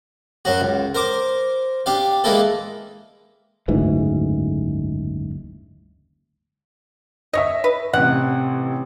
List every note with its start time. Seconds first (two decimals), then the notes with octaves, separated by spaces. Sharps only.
0.45 F#2 F#3 F#4
0.61 C#2
0.95 A#4 C5 D6
1.86 D4 G4 F5
2.24 E3 G#3 A#3 E4 A4
3.68 F#1 D2 G#2 E3
7.33 C#5 D#5 E5 A#6
7.64 B4
7.93 A1 C3 F#5